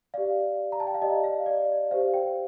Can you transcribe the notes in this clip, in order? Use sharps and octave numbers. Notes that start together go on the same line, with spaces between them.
G4 D5 F5
A#5
A5
G5
F5
G4 D5 D#5
F5
D5
G4 C5 F5
G5